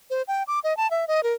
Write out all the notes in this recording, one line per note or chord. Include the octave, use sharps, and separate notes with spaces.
C5
G5
D6
D#5
A5
E5
D#5
A#4